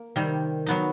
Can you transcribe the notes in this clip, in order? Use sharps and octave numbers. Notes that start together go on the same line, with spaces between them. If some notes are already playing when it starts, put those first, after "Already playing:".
Already playing: A#3
C3 D#3 G3
F#3 B3 D#4